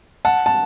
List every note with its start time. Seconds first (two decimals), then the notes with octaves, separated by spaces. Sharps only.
0.25 F#5 A5
0.46 A5